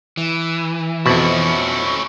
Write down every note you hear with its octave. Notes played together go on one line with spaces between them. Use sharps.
E3
F2 B2 C#4 E4 C5 C#6